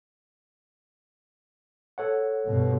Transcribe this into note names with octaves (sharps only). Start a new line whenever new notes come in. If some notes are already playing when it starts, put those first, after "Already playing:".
A4 C#5 F#5
G2 B2